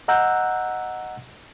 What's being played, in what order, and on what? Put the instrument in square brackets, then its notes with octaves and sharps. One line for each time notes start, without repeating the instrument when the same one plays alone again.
[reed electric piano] D#5 F#5 A#5 E6 F#6 G6